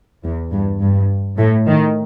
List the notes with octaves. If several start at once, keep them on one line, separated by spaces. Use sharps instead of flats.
E2
G2
G2
A2
D#3